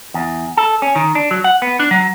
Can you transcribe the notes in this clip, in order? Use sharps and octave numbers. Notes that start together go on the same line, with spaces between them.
E2
A4
C#4
D#3
D4
F#3
F#5
B3
D4
F#3